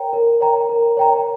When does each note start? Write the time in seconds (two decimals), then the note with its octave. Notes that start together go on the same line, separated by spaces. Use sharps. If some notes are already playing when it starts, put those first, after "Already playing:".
Already playing: A#4 C#5 G5 A#5
0.13 A#4
0.41 C#5 G5 A#5
0.69 A#4
0.97 C#5 G5 A#5